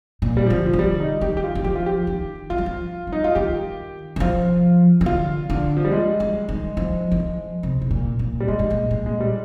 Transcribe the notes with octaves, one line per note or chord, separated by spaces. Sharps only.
A#2
G3
D3 F3
F3
C3
D3 G3
D#4
D#3 G4
G4
F4
D#3
F3 G4
F4
G4
D#3
F3 F4
G3
F3
G3
D#4
F4
D#3 G4
D#3
F3 F4
D#3
D3 F4
D3
F3
G3
G#3
G3
D#3
F3
D#3
F3
C3
C3
A#2
A#2
G3
A#2 G#3
G#2
A#2
A#2
G#3
G3